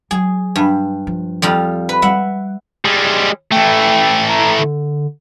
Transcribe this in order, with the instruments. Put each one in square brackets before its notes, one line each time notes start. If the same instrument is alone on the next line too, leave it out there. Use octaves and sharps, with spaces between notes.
[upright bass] F#3 [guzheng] G#4
[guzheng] G2
[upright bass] F3
[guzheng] F2 G3 F4
B4
[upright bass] G3 [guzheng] E5 F#5
[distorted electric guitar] G3 G#3
[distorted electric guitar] E3 A3 [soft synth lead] G5
[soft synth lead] A#5
D3